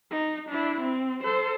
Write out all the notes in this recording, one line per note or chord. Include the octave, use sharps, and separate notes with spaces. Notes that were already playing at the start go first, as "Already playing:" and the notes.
D#4
D4 E4
C4
A4 C5